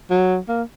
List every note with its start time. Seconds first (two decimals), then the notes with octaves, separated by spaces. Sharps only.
0.10 F#3
0.49 A#3